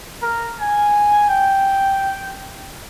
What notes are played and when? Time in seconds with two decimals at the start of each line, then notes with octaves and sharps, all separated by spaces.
0.22 A#4
0.60 G#5
1.29 G5